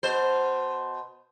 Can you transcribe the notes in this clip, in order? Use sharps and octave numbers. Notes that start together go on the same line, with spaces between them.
B2 C5